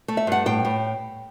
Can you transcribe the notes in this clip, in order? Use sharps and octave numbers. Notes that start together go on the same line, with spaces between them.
A3
E5
G2 F#5
A2 G5
A2